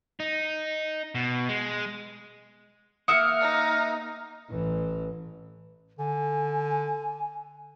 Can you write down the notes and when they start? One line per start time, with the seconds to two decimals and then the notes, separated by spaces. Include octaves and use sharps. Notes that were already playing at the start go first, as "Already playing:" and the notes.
0.20 D#4
1.15 B2
1.49 G#3
3.08 A#3 E5 F#5 D#6 F6 C#7
3.42 D#4
4.50 A1 E3
5.99 D3 G#5